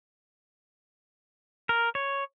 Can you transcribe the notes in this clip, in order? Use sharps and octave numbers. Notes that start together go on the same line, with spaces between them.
A#4
C#5